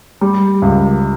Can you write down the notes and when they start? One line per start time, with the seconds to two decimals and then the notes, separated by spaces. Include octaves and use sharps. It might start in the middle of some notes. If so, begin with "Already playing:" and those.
0.21 G3
0.62 C#2